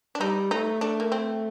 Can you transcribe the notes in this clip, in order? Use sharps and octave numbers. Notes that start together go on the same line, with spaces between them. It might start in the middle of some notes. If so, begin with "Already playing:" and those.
D4
G3 D#4
A3 D#4
A3 D4
A#3
C4